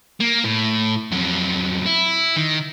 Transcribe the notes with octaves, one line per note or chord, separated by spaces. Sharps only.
A#3
A2
F2 F#3
E4
D#3